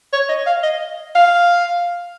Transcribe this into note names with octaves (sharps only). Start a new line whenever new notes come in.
C#5
D#5
F5
D#5
F5